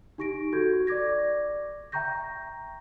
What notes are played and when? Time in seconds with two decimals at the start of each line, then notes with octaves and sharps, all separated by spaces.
0.18 D#4 G4 C#6 A#6 D7
0.53 F#4 A4 C#6 G6 G#6
0.87 D5 C#6 D6 G#6 A#6
1.92 E5 G5 A#5 C#6 G6 A#6